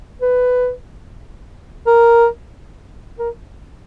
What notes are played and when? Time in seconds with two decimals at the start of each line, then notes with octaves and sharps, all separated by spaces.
0.22 B4
1.87 A#4
3.19 A#4